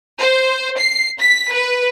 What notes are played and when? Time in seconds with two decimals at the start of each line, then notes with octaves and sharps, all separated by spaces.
0.20 C5
0.77 C7
1.18 B6
1.52 B4